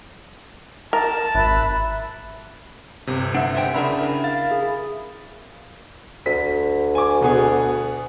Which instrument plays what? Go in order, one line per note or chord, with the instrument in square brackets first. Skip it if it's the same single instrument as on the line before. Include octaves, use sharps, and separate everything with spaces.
[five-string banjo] A#4 [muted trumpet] A5
[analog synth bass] G#1 [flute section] E5 B5 F#6
[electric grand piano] G1 C3
[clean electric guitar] D4 E5 [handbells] F#5
[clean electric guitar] C5 E5 G5
[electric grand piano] C#3 D4 [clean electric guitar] E4 A#4 E5
[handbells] F5 [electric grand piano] A6
[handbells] G#4
[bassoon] D2 [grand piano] B6
[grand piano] G#5 D6
B2 B3 G#4